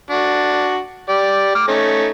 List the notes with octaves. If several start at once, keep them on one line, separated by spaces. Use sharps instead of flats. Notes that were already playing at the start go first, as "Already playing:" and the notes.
D4 F#4
G4 D5
D6 F6
A3 C#4 D#4